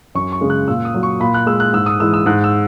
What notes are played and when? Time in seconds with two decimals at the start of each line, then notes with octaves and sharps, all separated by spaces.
0.15 F#2 C#6
0.32 C#6
0.41 C#3 G#3
0.50 F#6
0.68 A#2 E6
0.85 D#6
0.95 F#3
1.03 C#6
1.20 A#2 B5
1.34 F#6
1.46 G#3 E6
1.60 F#6
1.73 G#2 E6
1.86 D#6
2.00 E3 G#3 E6
2.14 E6
2.26 G#2 F#6
2.44 E6